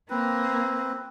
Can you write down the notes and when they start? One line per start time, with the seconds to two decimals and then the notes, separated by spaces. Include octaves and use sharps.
0.10 A#3 C4 B4